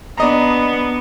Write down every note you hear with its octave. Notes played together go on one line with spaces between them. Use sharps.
B3 D4 D#5 A#5